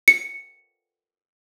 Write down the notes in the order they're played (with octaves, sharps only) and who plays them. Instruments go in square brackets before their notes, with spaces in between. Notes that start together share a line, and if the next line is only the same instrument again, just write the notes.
[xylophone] C#7